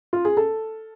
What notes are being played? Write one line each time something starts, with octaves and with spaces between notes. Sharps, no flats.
F4
G#4
A4